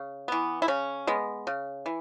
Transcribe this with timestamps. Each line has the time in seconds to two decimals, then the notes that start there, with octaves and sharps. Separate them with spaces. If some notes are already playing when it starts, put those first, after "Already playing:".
Already playing: C#3
0.28 E3 B3
0.62 E4
0.68 C#3 C#4
1.07 G#3 B3
1.47 C#3
1.86 E3